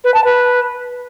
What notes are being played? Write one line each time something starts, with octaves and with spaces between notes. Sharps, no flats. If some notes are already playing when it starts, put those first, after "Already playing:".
B4
A5
B4